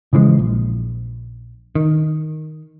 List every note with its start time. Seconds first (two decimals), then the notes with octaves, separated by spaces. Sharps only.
0.13 C#3 E3 F3 G#3
0.39 A#1
1.75 D#3